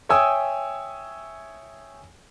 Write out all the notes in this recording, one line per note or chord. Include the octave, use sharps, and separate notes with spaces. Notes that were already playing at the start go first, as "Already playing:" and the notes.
C#5 E5 G5 G#5 D#6 E6